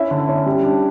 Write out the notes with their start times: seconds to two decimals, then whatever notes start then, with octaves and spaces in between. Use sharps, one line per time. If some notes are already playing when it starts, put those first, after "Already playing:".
Already playing: C#4 E4 E5
0.11 D3
0.29 C#4
0.46 G3
0.63 D4